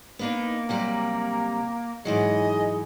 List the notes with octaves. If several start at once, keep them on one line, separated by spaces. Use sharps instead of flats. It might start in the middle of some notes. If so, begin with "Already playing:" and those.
A#3 B3 D4 D#4
C3 F#3 G3 A#5
G#2 E3 F#3 G#4 D#5